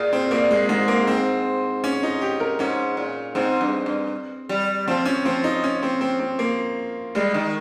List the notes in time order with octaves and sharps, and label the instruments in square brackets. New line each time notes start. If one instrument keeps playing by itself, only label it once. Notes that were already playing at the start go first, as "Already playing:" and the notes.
Already playing: [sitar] A#2 [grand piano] F4 G#4
[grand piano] C4
[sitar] A#2 [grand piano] A#3
[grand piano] G#3
[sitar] G#2 [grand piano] G#3
[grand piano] A#3
C4
C#4
D#4
G4
A#4
[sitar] G#2 [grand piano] C#4
[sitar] A#2
[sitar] G#2 [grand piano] C4
[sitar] G2
G2
G3
[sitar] F3 [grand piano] C4
[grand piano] C#4
[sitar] F3 [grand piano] C4
[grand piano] D#4
C#4
C4
C4
C4
A#3
[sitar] G3 [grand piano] G#3
[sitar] D#3